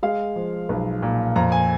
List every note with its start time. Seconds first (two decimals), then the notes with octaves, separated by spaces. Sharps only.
0.03 G#3 F5
0.36 F3
0.69 B1
1.02 A#2
1.36 F2 A#5
1.52 G#5